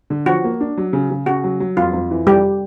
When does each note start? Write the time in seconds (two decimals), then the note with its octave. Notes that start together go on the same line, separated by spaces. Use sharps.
0.10 D3
0.26 F3 F#4
0.44 A#3
0.61 D4
0.78 F#3
0.93 C#3
1.10 C#3
1.26 C#3 F#4
1.44 F#3
1.60 F#3
1.77 F2 F4
1.93 F2
2.11 E3
2.27 F2 G3 G4